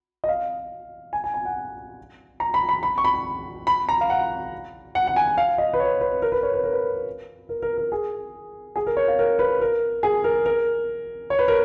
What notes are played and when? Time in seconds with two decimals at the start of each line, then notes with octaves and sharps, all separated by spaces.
0.24 D#5
0.29 F5
1.13 G#5
1.24 G#5
1.34 G#5
1.45 F#5
2.40 A#5
2.54 B5
2.69 B5
2.83 B5
2.98 C#6
3.04 B5
3.67 B5
3.89 A#5
4.01 F5
4.10 F#5
4.95 F#5
5.07 F#5
5.16 G#5
5.38 F5
5.58 D#5
5.73 B4
5.80 C#5
6.01 B4
6.22 A#4
6.32 B4
6.43 C#5
6.54 B4
6.64 A#4
6.73 B4
7.49 A#4
7.62 A#4
7.78 A#4
7.92 G#4
8.76 G#4
8.87 A#4
8.97 C#5
9.08 F5
9.19 A#4
9.39 B4
9.61 A#4
10.03 G#4
10.24 A#4
10.46 A#4
11.30 C#5
11.39 B4
11.48 A#4